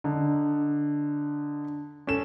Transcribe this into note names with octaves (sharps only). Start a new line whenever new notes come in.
D3 D#4
C#4 A4 E7